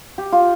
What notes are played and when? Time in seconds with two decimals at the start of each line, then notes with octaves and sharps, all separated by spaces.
0.18 G4
0.32 F4